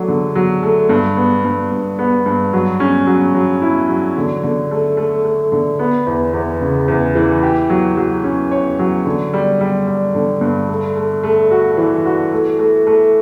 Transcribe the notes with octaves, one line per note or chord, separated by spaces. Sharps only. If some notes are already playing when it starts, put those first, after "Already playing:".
Already playing: F#3 A3 D4
D3
F#3
A3
G2
B3
G2
G2
B3
G2
F#3
C#4
F#3
F#3
E4
F#3
D3
D3
A3
A3
A3
D3
B3
E2
E2
C#3
E2
E3
G4
F#3
F#3
C#4
C#5
F#3
D3
G3
G3
G3
D3
G2
A3
A3
A3
F#4
E3
F#4
A3
A3
A3